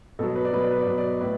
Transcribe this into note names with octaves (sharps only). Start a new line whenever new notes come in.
B2 F#3 A4
B4
D5
B2 F#3 B4
D5
B4
D5
B2 F#3 B4
D5
B4
A2 B4